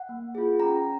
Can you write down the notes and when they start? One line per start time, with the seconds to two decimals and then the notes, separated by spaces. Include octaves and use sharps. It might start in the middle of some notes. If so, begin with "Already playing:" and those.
Already playing: F#5
0.09 A#3
0.35 F4 G#4
0.59 C#4 A#5